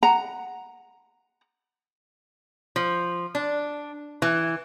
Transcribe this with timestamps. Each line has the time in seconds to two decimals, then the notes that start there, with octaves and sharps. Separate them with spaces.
0.03 F#5 A#5
2.76 F3
3.35 D4
4.22 E3